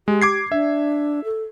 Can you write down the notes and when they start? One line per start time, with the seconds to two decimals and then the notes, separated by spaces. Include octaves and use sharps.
0.08 G#3 G4
0.22 D6 G#6 C7
0.52 D4 E5
1.24 A4